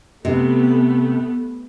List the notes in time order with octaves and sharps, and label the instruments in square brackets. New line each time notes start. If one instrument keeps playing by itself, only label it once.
[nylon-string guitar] C3 [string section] A3 B3